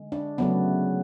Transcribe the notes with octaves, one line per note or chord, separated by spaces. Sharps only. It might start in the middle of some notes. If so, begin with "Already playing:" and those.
Already playing: D3 G#3
D4
C#3 F#3 A3 B3